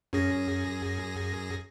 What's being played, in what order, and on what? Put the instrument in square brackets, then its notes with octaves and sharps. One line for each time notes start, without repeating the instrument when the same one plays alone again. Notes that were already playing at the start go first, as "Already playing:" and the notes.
[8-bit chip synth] F#2 G#4 A#6 [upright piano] C#4